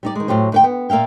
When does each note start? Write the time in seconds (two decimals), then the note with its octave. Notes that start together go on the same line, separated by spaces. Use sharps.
0.03 G3 D#4 D5
0.15 D#3 G#3
0.28 A2 F#3 G4 C5
0.52 D2 B4 G5
0.64 B3
0.90 A#2 A#3 E5 F5 G5